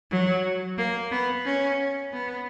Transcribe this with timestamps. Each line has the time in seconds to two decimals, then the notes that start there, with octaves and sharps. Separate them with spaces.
0.11 F#3
0.78 A#3
1.11 B3
1.45 C#4
2.12 B3